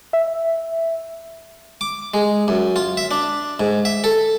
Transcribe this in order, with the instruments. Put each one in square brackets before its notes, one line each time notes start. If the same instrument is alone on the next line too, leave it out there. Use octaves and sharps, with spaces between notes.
[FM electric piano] E5
[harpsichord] D6
G#3
F#2
F4
E5
D4
G#2
E5
A4